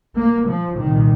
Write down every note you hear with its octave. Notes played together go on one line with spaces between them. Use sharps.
A#3
F3
C2 A#2 D#3